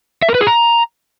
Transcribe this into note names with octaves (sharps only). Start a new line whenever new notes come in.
E5
A#4
B4
G#4
A#5